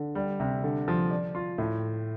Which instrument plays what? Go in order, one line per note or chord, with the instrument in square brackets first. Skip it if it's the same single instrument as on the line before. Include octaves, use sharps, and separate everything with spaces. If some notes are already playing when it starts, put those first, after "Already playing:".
Already playing: [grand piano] D3
G3
C3
D3
F3
D5
F4
A2